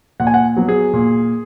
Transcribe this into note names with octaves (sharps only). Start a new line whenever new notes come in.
A#2 F#5
G#5
F#5
F#3 B3
G#4
A#2